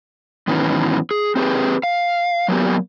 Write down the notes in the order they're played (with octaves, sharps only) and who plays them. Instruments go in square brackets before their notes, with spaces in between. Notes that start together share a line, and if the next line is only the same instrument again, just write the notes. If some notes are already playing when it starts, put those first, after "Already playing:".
[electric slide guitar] G#2 D#3 E3 F#3 B3 C#4
G#4
C4 G4 G#4 B4
F5
F#3 A#3 B3 G4